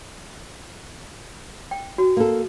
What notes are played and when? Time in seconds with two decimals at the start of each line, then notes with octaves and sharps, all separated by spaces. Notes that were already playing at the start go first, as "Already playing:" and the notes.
1.71 G5
1.98 F#4
2.17 A#3 A4